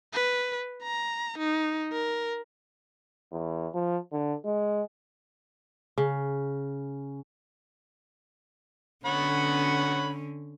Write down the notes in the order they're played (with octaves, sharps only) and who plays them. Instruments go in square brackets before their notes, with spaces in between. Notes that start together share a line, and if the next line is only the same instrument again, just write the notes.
[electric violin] B4
A#5
D#4
A#4
[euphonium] E2
F3
D3
G#3
[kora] C#3
[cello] D3 C#4 [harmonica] C#5 F#5 B5